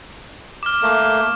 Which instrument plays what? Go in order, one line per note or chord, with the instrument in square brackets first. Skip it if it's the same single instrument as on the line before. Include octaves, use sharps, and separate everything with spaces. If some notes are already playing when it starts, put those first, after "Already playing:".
[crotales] D6 F6
[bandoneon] A3 A#3